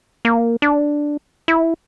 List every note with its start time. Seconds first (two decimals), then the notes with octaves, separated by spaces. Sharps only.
0.25 A#3
0.62 D4
1.48 E4